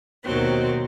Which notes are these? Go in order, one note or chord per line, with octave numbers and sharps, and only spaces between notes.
D#2 B2 D#3 F#3 C4